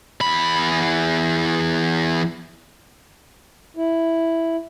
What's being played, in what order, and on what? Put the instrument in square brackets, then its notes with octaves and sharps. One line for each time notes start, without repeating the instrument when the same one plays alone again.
[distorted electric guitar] E2 B5
[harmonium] E4